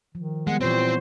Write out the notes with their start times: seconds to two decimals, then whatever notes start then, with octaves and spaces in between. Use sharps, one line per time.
0.15 D#3 F3
0.47 G3 G#3 B3 F#5
0.61 A#2 E3 C4 C5 C#5